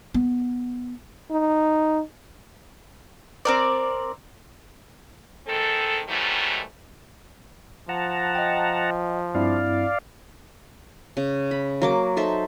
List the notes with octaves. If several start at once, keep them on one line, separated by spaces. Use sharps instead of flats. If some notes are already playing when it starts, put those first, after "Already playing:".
B3
D#4
C4 A#4 D5
D#3 G#3 C4 A4
G#2 D#3 E3 F#3 G3 A3
F3 F#5 A5 A#5
D#5 G5
G2 C4 E4 D5 F5
C#3
B5
F#3 A#3 D6
D#4 A4 C5 E5